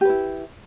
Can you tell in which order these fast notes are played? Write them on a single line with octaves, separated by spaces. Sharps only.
G4 B4 E4